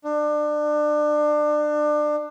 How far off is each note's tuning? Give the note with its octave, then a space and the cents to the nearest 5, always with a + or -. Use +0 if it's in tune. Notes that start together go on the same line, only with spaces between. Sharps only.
D4 +30